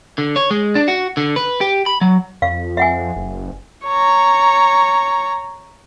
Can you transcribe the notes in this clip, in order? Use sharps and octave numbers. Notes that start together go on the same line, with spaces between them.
D3
C#5
G#3
D4
F#4
D3
B4
G4
B5
F#3
F2 F5
E5 F#5 G#5
F#1
C#5 A#5